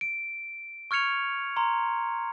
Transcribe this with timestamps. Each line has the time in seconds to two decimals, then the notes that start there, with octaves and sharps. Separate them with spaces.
0.01 D7
0.91 C#6 F6 G#6 C#7 F7
1.56 A#5 C6